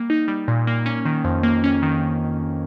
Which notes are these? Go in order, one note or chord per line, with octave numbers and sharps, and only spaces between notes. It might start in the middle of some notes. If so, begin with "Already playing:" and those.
Already playing: G3 A#3
D#4
G3
A#2
A#3
C#4
D#3
F2
A#3
C#4
D#3